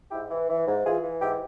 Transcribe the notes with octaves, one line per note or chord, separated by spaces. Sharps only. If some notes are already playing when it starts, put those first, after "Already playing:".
G#2 E4 G4
E3
E3
G#2
E3 F4 G#4
E3
G#2 E4 G4